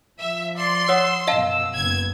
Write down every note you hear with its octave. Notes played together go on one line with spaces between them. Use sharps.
F3 E5
D5 C6
C#5 F#5 D#6 E6
F#2 B2 D#5 F5 A5
F#1 B3 G#6